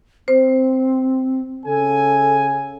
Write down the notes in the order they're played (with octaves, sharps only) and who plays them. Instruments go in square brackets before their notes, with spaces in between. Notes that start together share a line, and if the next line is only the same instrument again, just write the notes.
[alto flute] C4 [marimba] C5
[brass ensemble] C#3 G#5 [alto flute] A4